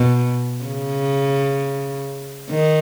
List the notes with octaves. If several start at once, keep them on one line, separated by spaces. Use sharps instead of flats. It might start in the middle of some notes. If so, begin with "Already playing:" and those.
Already playing: B2
C#3
D#3